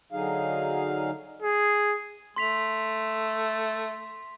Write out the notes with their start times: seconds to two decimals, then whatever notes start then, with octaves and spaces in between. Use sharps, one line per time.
0.12 D3 F#3 D#4 G#4 F5
1.42 G#4
2.36 A3 C6 B6 F7